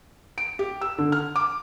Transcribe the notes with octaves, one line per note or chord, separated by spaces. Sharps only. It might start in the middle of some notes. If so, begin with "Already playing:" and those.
D7
G4
E6
D3
F6
D6